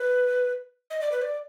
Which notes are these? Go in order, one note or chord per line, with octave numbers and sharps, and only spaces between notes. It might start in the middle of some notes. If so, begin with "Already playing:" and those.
Already playing: B4
D#5
D5
B4
D5